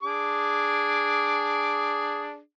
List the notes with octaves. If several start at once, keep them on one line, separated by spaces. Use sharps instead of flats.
D4 G#4 D6